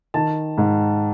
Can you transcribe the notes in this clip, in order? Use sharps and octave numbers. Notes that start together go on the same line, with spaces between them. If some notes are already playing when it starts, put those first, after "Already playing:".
D#3 A5
G#2